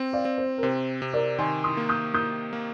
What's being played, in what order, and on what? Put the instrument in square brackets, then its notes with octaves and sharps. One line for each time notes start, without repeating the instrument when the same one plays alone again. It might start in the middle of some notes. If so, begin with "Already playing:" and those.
Already playing: [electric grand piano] C4
[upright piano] D5 F5
[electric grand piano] C4
[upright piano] C5
A#4
[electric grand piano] C3 [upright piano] C5
[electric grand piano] C3
[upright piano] A#4 D5
[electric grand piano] D#3 [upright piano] G#5 C6
[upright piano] C6 D#6
[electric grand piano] A#3
[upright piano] D#6 G6
[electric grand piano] A#3 [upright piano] D#6 G6
[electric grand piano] A#3